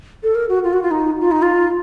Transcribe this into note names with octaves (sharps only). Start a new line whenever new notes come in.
A4
A#4
F#4
F4
F#4
F4
D#4
F4
D#4
F4